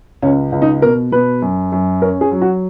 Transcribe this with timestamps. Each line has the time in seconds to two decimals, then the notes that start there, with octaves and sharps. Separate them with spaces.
0.22 C#2 C#4
0.52 C#2
0.62 D#4
0.82 B2 A#4
1.12 B2 B4
1.42 F#2
1.72 F#2
2.02 C#4 A#4
2.21 G#4
2.32 F#3
2.42 F#4